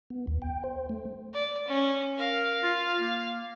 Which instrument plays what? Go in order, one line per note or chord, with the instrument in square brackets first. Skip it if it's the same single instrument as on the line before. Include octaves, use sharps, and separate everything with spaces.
[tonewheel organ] B3
D#2
G5
C5
A3
[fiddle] D5
C#4
[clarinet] A#4 [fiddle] F5
[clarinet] F4
A#3